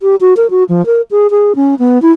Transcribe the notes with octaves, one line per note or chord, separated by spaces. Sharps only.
G4
F#4
A#4
F#4
F3
A#4
G#4
G#4
C#4
B3
E4